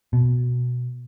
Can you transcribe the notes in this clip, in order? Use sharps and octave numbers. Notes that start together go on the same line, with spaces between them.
B2